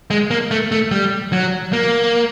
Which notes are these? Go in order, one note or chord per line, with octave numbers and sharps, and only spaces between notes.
G#3
A#3
A3
A3
G3
F#3
A#3